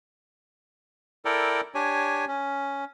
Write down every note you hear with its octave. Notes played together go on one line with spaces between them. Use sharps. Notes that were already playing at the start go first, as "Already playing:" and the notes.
E4 A4 A#4 D5 G5
D4 G4 C#5 G#5
C#4